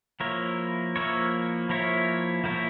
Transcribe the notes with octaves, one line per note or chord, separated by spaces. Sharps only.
F3 A#3 E4 A#4 C#5
F3 A#3 E4 A#4 C#5
F3 A#3 E4 A#4 C#5
F3 A#3 E4 A#4 C#5